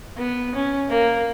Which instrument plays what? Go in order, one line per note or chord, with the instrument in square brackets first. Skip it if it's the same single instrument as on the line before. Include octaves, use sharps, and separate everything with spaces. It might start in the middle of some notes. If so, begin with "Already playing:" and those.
[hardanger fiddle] B3
C#4
A#3